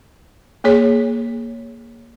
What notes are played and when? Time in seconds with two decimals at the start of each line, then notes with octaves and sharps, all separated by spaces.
0.64 A#3 G#4 C#5